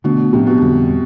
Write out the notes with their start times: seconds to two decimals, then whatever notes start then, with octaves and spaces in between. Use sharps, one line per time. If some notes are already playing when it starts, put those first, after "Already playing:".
0.04 B2 D3 A3 D4
0.33 A2 C3 F3 B3 D4
0.47 B2
0.61 F2 D3 G3